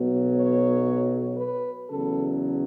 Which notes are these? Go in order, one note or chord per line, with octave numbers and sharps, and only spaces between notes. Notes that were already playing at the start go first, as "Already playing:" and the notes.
Already playing: B1 B2 F#3
C#5
B4
E2 C#3 F#3 A4